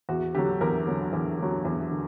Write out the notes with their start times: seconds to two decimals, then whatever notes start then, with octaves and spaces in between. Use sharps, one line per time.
0.09 E2 F#4
0.35 D3 F#3 G4
0.61 E2 A#4
0.87 D3 F#3
1.13 E2
1.39 D3 F#3
1.65 E2
1.91 D3